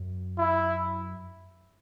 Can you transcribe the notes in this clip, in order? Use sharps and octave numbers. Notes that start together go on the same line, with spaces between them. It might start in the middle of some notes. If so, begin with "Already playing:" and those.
Already playing: F#2
E4